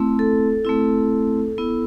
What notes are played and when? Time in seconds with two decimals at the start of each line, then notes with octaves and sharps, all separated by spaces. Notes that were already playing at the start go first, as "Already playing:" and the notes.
Already playing: A3 C4 E4
0.19 A4
0.65 A3 C4 E4
1.58 B3 E4